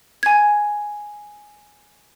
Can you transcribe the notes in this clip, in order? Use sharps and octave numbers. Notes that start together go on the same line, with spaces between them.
G#5 G#6